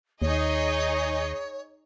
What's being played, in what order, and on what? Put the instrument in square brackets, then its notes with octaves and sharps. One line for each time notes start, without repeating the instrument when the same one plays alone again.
[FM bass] D#2 [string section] D#4 G#4 D#5 [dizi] C#5